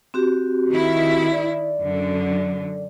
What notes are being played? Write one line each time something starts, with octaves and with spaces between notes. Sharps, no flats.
C4 F#4 G4
D#3 E4
D5
F#2 D3